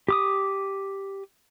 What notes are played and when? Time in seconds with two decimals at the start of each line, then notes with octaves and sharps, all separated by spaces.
0.08 G4 D6 D#6